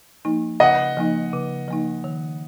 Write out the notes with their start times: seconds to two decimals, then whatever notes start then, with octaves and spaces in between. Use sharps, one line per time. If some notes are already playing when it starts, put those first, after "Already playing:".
0.25 F3 A#3 D#4
0.60 C#3 D#5 F#5
0.97 F3 A#3 D#4
1.33 C#3
1.68 F3 A#3 D#4
2.04 D#3